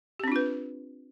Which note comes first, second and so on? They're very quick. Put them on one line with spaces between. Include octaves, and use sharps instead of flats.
G4 C4 D4 F4 B4